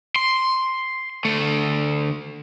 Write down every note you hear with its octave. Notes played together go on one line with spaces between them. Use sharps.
C6
D2 A3